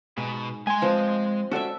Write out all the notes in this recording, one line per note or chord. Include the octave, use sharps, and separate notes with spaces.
G#2 B2
G#3 G#5 C6
F3 C4
C#4 F#4 A4 D5 E5